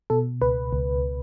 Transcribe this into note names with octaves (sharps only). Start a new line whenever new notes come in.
B2 A4
C#2 B4
C#2